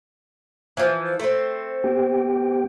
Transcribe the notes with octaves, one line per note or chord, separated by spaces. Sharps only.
E3 F3
A3 C4
B3 G4 G5